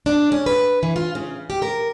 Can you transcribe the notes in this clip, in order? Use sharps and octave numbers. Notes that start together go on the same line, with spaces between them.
D4
C#4
B4
E3
F4
C#3
G4
A#4